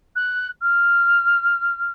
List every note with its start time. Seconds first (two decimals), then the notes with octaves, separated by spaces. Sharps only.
0.16 F#6
0.61 F6